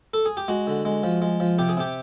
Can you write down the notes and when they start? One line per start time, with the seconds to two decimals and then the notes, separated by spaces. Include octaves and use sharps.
0.14 A4
0.26 G#4
0.37 G4
0.48 G#3 F#4
0.67 D3
0.85 G#3
1.03 F3
1.22 G#3
1.40 F3
1.58 C3 G4
1.69 G#4
1.77 C3 G4